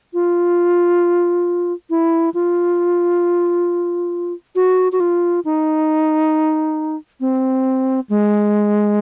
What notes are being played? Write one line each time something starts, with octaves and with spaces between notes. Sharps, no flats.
F4
E4
F4
F#4
F#4
F4
D#4
C4
G#3